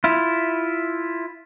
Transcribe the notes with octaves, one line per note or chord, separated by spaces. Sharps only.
E4 F4